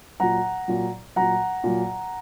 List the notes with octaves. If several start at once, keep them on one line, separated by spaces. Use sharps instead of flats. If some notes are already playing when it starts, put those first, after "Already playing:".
A#2 F#3 F#5 A#5
A#2 F#3
A#2 F#3 F#5 A#5
A#2 F#3